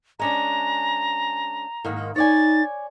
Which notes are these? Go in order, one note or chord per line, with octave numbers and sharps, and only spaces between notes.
G#3 C#4 D4 A#5
G#2 D#3 A#3
D#4 C#5 D5 G#5 A6